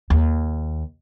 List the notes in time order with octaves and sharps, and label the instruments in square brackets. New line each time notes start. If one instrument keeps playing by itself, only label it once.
[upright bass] D#2